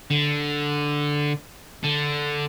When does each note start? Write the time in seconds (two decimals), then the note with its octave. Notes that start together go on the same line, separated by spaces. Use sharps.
0.11 D3
1.84 D3